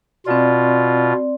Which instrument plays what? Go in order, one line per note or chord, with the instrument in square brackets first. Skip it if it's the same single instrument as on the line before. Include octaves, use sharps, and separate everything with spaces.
[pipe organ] B2 F4 [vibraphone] C4 D5